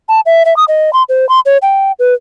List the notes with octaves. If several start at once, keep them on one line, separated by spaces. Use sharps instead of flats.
A5
E5
E5
D#6
D#5
C6
C5
C6
C#5
G5
B4